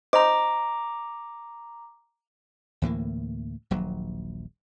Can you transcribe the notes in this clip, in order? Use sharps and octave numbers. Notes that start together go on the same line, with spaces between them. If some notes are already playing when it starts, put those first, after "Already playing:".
C5 D#5 A#5 D6
D2 A2 E3 A#3
D#1 A#1 F#3